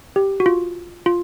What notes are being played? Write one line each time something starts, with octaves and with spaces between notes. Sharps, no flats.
G4
F#4
F4
F4